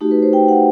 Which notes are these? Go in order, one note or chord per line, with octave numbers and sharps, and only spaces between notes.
A3 D#4 F#4 G4
B4
C5
G5
F#5